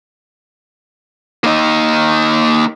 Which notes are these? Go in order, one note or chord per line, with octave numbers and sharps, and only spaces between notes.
A#3 D#4